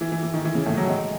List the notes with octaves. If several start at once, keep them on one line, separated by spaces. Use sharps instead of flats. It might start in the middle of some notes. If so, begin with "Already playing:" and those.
E3
E3
E3
D#3
E3
C#3
A2
F#3
G#3